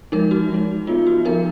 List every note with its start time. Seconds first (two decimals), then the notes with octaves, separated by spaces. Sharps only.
0.12 F3 G#3 D#4 A#4
0.31 F#4
0.50 F3 G#3 D#4
0.87 F3 B3 D#4 F4
1.07 F#4
1.25 F3 B3 D#4 A#4